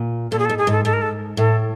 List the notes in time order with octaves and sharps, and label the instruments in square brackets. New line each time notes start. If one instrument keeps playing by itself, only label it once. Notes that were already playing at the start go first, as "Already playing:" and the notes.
Already playing: [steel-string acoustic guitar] A#2
[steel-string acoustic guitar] A#2 [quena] A4
[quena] G#4
A4
[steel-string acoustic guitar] G#2
[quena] G#4
[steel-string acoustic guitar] G#2 [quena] A4
[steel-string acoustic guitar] G#2 [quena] A4
[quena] A#4
A4
[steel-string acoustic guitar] A2 [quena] A4